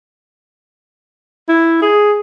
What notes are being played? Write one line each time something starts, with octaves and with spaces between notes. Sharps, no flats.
E4
G#4